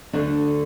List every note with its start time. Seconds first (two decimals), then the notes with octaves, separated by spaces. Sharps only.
0.13 D2 D3 A3 D4